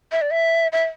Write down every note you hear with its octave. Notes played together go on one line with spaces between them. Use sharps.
E5
D5
E5
E5